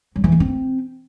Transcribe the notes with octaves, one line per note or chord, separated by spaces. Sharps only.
F#3
E3
A#3
C4